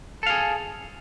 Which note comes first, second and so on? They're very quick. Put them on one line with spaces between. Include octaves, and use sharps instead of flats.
A4 F5 G#4